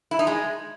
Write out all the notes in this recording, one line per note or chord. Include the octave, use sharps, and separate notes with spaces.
E4
D#4
G#3